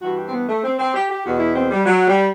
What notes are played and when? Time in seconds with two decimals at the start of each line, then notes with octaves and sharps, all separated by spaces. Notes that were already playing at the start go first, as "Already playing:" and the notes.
0.01 G2 E3 F#4
0.17 G4
0.27 C4
0.32 B3
0.48 A3
0.64 C4
0.78 C4
0.94 G4
1.10 G4
1.24 E2 B2 F#4
1.40 E4
1.56 C4
1.71 G3
1.86 F#3
2.07 G3